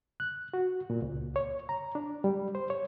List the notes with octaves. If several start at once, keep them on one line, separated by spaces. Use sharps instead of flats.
F#6
F#4
A#2
C#2
C#5
A#5
D4
G3
C5
C#5